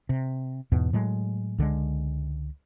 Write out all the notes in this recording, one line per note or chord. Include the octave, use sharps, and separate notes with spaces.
C3
E2 G#2 B2
A2 F#3 G#3
C#2 D3 D#3 G#3